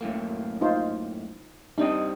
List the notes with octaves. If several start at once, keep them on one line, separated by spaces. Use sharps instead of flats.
F#2 A2 A#3
D#4 F4 C5
G3 C4 D4 D#4 D#5